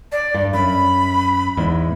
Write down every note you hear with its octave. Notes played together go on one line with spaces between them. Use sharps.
D5
G2
F#2 B5
E2 G#2